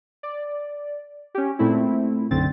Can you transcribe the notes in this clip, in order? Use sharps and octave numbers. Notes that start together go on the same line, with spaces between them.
D5
C#4 G4
A#2 A3 C4 E4
B1 F#2 D3 C4 A6